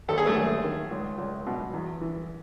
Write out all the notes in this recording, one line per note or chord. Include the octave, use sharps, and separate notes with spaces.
D#2 A4
G#4
A3 A4
D#2
D#3
C#2
C#2
B2
E2
E3